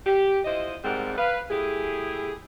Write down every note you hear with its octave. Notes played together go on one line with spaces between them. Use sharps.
G4
E4 F4 C5 D#5
G#2 C3 G3 C4 A#4 F#5
B4 F5
A3 E4 G4 G#4